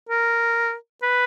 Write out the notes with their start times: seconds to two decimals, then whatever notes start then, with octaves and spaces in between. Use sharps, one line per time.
0.09 A#4
1.03 B4